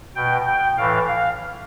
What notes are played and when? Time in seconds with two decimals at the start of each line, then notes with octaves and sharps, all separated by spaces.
0.16 B2 G5
0.47 G5
0.77 A2 E3 F5
1.07 F5